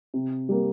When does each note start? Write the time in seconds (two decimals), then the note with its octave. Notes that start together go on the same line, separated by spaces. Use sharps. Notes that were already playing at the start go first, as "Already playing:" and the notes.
0.14 C3
0.49 G3 A#3